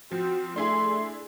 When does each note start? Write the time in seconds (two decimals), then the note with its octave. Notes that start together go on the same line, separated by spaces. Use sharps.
0.11 F3 C4 F#4
0.56 A3 D4 E4 G#4 C6